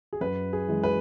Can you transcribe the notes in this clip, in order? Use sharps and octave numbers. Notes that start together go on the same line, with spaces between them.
G#4
F#2 B4
G#4
E3 G#3
B4